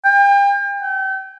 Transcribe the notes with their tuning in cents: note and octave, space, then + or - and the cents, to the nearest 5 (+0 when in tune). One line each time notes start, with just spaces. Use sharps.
G5 +40
G5 -40